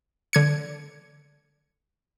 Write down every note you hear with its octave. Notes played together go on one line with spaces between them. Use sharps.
D3 G#6 C#7